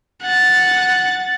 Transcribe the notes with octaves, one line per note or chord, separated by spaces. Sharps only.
F#5 A6